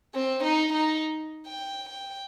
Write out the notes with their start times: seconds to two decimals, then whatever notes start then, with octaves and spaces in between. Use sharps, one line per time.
0.15 C4
0.44 D#4
0.73 D#4
1.46 G5
1.89 G5